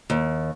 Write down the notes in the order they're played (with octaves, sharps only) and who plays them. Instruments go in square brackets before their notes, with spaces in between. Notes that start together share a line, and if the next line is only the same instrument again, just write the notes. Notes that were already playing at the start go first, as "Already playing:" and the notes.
[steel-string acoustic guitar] D#2